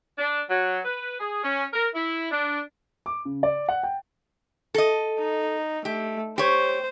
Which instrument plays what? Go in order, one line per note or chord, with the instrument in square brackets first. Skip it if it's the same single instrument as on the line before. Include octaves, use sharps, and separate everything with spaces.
[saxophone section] D4
F#3
B4
G#4
C#4
A#4
E4
D4
[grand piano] D6
C#3
D5
F#5
G5
[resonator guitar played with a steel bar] A4 D#5
[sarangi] D#4
[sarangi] A3 [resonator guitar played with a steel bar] G4
[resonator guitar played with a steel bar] G4 C#5 [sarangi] C5